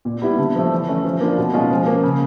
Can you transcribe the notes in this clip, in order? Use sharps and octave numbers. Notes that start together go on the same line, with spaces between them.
A#2
G3 B3 E4
D3
F3 A3
E3
A3 C#4
F3
A#3 D4 F4
B2
G#3 C#4 F4
F3
A#3 C#4
C#3